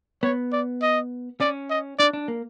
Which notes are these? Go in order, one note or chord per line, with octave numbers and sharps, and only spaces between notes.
B3 C#5
D5
D#5
C#4 D5
D#5
D4 D5
D4
A#3